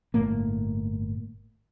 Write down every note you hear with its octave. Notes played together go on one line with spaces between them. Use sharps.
G1 A2 A3 A#3